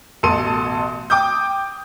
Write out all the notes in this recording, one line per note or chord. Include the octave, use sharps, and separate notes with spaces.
A1 B2 A4 A5 C6 D#7
G5 D6 D#6 G6